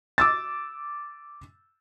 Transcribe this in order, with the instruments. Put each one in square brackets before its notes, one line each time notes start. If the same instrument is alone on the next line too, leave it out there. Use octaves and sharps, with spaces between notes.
[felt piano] D6 E6 A6